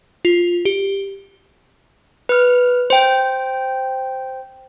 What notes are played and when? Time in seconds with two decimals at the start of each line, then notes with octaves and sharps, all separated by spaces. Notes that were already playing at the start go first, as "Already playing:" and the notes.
0.25 F4
0.65 G4
2.29 B4 F6
2.90 C5 G5